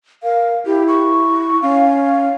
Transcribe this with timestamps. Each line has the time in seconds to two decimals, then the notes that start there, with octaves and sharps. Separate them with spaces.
0.23 A#4 F5
0.66 E4 G4
0.88 C#6
1.62 C#4 F5